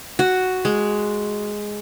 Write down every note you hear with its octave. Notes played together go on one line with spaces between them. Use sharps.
F#4
G#3